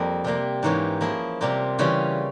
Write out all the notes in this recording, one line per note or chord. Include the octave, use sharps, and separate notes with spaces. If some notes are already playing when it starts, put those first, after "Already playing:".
Already playing: F2 G3 A#3 C4
C3 G3 A#3
G#2 E3 A#3 C#4 G4
F3 A#3 E4 G#4
C3 G3 A#3 F4
C#3 E3 G3 C#4 F4